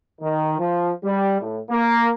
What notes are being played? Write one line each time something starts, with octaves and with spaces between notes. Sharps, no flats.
D#3
F3
G3
A2
A#3